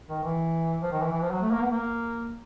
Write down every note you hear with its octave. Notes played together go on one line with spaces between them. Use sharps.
D#3
E3
F3
D#3
E3
E3
F3
F#3
A3
A#3
B3
A#3